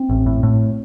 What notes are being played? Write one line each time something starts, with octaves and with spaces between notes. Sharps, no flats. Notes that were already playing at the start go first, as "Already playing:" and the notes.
Already playing: C4
A1
A2
A2